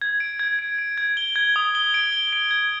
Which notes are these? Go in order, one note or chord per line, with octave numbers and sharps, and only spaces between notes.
G#6
D7
G#6
D7
D7
G#6
G7
G#6
D#6
G7
D7
G7
D7
G#6